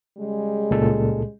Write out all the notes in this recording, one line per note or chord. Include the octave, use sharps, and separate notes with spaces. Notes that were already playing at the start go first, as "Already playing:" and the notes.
C#3 G3 G#3
C#2 A#2 A4